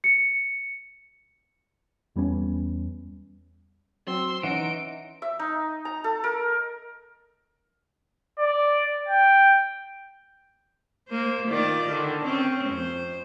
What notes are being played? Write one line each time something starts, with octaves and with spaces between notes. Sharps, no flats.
C#7
E2 G3 B3 C#4
F#3 C4 C6 E6
E3 C#4 D#4 F#5 D7
E5
D#4
A#5
A4
A#4
D5
G5
A#3 C5
D#3 F4 D5
D3 D#3
C4 C#4
F2 C5